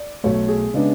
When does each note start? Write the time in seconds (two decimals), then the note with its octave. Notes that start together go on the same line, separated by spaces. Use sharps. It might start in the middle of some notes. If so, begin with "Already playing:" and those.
Already playing: D5
0.24 B1 B2 F#3 A3 C#5
0.48 G#4
0.74 C#3 G#3 B3 D4